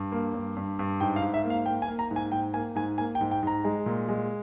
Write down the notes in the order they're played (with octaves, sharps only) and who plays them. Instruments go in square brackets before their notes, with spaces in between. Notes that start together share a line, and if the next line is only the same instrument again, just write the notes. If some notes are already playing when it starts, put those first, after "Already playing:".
Already playing: [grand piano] G2
A#3
G2
G2
G2
G#2 G5
F5
G#2
E5
A#3
F5
A#3 G5
G#5
A#3
A#5
G#2
G#5
G#2 G5
A#3 G#5
G#2 G#5
A#3 G#5
G5
G#2
G5
G#2 A#5
G#3
A#2
G#3